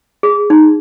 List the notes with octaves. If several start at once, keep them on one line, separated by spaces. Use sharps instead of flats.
G#4
D#4